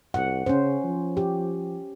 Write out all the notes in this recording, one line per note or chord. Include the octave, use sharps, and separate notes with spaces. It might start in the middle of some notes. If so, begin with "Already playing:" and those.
C2 F#5
C#3 C#4 C5
F3
G4